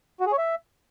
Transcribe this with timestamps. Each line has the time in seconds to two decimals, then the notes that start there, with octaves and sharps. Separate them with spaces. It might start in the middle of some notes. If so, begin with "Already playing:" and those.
0.20 F#4
0.26 G#4
0.32 C#5
0.38 E5